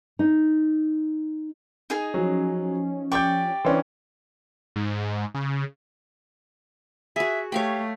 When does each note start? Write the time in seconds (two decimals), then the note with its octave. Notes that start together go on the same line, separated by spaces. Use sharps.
0.19 D#4
1.90 D#4 G#4 G#5
2.14 F3 F#3 C#4
3.12 G4 D5 G5 C#6 G6
3.65 E3 C#4 D4 C5 C6
4.76 G#2
5.35 C#3
7.16 F#4 G#4 E5
7.52 A3 G4 C#5 F5 G5